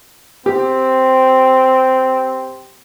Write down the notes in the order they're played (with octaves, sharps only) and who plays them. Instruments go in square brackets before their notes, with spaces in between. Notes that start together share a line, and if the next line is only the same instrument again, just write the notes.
[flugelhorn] C4 [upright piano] G4